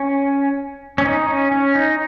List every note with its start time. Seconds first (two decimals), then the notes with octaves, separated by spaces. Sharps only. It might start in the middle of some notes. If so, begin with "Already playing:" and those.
Already playing: C#4
0.98 C#4
1.05 D#4
1.28 C#4
1.52 C#4
1.75 D#4